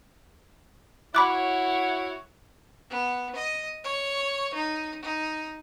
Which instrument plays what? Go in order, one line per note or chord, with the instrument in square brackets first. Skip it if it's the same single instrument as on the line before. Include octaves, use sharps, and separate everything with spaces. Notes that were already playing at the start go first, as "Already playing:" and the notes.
[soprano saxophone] E4 [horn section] F#4 C#5 [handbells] B5 D6 F#6
[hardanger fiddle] B3
D#5
C#5
D#4
D#4